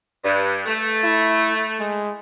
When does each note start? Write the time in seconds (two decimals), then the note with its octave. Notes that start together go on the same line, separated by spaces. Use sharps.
0.24 G2
0.65 A3
1.04 E4
1.80 G#3